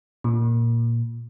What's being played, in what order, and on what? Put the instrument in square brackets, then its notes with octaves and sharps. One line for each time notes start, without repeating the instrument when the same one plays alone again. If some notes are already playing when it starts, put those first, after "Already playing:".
[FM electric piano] A#2